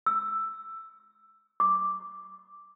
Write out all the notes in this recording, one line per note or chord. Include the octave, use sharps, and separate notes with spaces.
E6
D6